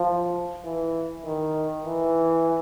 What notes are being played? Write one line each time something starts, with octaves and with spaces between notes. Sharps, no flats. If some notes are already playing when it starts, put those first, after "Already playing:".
Already playing: F3
E3
D#3
E3